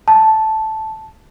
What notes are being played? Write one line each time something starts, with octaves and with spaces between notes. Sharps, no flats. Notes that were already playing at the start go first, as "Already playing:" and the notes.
A5